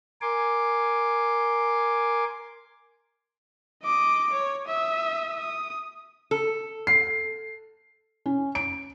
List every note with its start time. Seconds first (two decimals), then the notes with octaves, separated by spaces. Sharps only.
0.21 A#4 G#5 C6 D6
3.84 D#5 D6
4.33 C#5
4.68 E5 D#6
5.40 D#6
6.31 A4
6.87 C7
8.26 C#4
8.55 D7